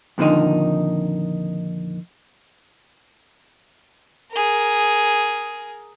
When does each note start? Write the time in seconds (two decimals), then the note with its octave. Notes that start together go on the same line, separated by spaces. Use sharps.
0.18 F2 A#2 D3 D#3 D#4
4.31 G#4 A#4